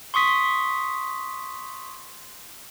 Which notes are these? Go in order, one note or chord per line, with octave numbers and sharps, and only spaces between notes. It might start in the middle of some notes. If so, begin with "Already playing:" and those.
C6 C#6 D#6 B6